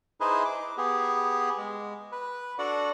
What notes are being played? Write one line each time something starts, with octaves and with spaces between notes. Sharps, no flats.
D#4 E4 G#4 B4 C5 D#5
D6
B3 G4 G#4
G#3
B4
D4 F#4 A4 D5 F#5